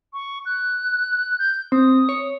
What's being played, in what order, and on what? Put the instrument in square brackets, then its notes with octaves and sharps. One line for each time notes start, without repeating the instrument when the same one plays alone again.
[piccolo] C#6
F#6
G6
[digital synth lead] C4 [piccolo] D#6
[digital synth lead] C#5